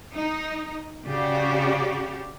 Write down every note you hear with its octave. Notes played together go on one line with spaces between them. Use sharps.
D#4
C#3 F#4 G4 D5